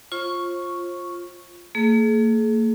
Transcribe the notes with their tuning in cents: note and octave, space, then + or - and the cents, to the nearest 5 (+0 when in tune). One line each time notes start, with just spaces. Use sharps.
F4 +0 C5 +40 C#6 +0
A#3 -45 G#4 +35